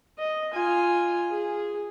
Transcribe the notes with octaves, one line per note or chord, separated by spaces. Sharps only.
D#5
F4 G#5
G#4